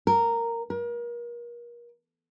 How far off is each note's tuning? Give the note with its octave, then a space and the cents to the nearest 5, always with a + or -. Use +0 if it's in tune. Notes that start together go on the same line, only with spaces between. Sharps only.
A#4 -10
A#4 +35